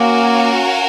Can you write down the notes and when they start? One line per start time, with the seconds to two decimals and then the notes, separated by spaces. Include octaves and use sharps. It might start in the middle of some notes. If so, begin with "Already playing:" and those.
Already playing: A#3 C#4 F#4 A#4 F5 G#5